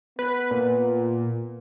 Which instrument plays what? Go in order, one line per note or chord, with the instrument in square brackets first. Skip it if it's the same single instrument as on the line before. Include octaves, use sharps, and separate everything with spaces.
[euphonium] B3 [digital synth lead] B4
[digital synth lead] A#2